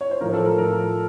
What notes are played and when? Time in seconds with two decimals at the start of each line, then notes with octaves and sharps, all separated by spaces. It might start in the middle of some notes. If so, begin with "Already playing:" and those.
0.01 C#5
0.11 C5
0.21 A2 F3 A#4
0.34 A4
0.46 A#4
0.57 A2 F3 A#4